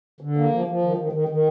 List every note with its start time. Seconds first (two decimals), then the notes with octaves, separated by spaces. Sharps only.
0.21 D3
0.37 A#3
0.52 F3
0.68 F3
0.82 D#3
0.98 D#3
1.12 D#3
1.28 D#3